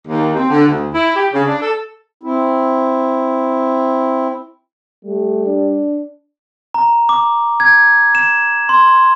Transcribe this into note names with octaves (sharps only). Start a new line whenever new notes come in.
D#2
C4
D3
D2
E4
G4
C#3
D4
A4
C4 E4
G3 A3
D4
A#5
D6
G#6
E7
C6